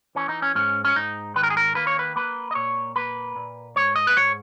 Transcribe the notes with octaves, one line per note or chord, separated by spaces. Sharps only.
E3 C#4
D#4
C#4
G#2 C#4
C#4
G#2 D#4
D#3 B4
A#4
G#4
A#4
A#3 B4
C#5
B4
A#3 B4
D#5
A#2 C#5
A#3 B4
A#2
G#2 C#5
D#5
B4
G#2 C#5